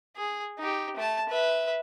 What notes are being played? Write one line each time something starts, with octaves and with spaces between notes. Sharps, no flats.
G#4
D#4 G4
A3 A5
B4 E5